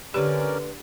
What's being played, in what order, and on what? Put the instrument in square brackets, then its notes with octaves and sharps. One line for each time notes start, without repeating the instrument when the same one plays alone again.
[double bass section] D3 [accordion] C#4 A#4 D5 [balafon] G4 [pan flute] B4